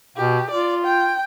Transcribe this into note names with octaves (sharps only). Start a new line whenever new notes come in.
B2 G4
F4 D5
G5